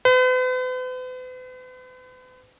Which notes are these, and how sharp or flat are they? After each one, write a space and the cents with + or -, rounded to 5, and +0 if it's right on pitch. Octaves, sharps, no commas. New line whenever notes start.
B4 +45